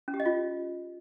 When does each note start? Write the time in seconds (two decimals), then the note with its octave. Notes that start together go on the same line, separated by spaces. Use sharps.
0.08 C#4
0.14 G4
0.20 D#5
0.26 F4